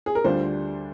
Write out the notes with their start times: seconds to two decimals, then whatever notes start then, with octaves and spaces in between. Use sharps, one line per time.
0.06 G#4
0.15 A#4
0.24 D2 D3 G3 D4 F4 C5